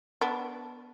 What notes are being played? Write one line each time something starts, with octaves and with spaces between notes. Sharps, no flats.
B3 D4